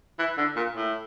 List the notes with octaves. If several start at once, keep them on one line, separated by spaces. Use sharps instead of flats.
E3
D3
A#2
A2